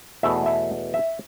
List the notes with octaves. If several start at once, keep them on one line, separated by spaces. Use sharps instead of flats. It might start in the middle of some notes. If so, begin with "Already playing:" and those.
E2 B2 A3 E5
E5
E5